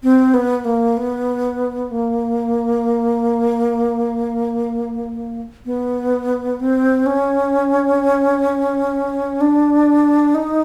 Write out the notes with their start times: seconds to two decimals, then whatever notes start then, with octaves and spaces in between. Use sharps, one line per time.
0.03 C4
0.34 B3
0.65 A#3
0.97 B3
1.91 A#3
5.66 B3
6.60 C4
7.06 C#4
9.41 D4
10.35 D#4